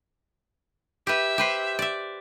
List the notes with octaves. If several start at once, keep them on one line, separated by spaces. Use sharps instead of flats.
G4 B4 E5
G4 B4 C5
D5 E5